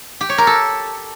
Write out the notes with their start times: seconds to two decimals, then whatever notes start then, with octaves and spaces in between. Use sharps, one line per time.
0.21 G4
0.29 C#5
0.38 A#4
0.47 A4